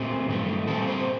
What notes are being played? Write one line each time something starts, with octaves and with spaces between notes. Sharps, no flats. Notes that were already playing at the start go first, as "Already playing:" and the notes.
Already playing: A#2 A3 C4 G4
G2 D#3 F#3 A3
A#2 G3 C4 A4
C5